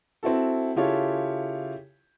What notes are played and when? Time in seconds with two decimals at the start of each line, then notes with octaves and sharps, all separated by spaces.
0.23 C4 E4 F#4 A4
0.76 C#3 E4 F4 G4 A4 C#5